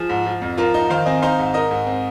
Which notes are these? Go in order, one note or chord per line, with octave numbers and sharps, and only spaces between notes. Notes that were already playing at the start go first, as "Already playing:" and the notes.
Already playing: F3 G#4
G#2
F3
F2
F3 F4 A#4
D#4
D#3 C5 F5
C4 D#5 G#5
D#4 C5 F5
G#2
D#4 A#4 D#5
G#2
C4